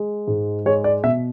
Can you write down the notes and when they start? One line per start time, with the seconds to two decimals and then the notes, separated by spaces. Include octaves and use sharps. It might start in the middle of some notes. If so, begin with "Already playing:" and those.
Already playing: G#3
0.28 G#2
0.66 G#3 C#5
0.84 D5
1.04 B2 E5